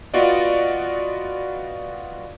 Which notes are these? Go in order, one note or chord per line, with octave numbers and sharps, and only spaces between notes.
B3 F4 F#4 D5 D#5